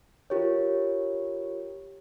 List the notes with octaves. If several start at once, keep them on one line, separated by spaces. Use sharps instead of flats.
F4 G4 A#4 C#5